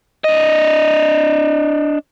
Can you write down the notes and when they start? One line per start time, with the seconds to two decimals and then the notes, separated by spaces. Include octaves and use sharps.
0.24 D4 D#5